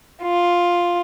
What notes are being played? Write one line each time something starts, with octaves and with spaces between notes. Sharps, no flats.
F4